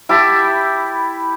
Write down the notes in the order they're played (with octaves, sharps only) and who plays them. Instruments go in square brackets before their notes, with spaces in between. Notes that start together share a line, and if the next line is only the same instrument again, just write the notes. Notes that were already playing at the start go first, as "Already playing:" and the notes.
[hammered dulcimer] E4 G4 A5 B5